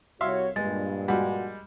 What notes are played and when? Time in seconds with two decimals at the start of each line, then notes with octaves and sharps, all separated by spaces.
0.21 C2 F#4 C#5 E5 F5 C6
0.56 G2 A#2 G#3 A6
1.08 G3 G#3 F#4 F#5